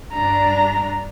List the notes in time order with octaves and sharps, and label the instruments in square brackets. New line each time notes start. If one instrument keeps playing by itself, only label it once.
[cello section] G2 D4 [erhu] A#5